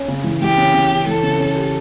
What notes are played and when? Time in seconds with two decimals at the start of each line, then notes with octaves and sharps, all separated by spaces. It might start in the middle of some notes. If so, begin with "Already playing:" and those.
Already playing: C#4
0.08 C#3
0.24 E3
0.41 E3 G4
0.58 C#3
0.74 C#3
0.91 C#3
1.07 E3 A4
1.23 C#3
1.40 C#4
1.56 G4